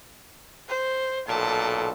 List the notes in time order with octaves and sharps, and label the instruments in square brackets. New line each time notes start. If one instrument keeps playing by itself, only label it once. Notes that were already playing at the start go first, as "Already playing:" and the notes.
[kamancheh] C5
[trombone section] B1 A#2 A4 [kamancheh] A5